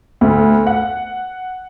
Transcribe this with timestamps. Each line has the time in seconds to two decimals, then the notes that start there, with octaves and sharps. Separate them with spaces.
0.21 D2
0.67 F#5